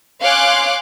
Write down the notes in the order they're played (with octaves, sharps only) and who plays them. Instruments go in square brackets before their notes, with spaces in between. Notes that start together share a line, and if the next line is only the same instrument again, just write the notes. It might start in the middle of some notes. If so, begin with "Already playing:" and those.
[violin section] C#5 F5 G#5 C6 D6 F#6